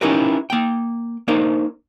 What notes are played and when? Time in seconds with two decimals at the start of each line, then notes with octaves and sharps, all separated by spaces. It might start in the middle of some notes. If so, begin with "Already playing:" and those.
0.01 C#4 D#4 E4 G4 A#4 B4
0.50 A#3 G5
1.28 A#3 D4 D#4 A#4 C5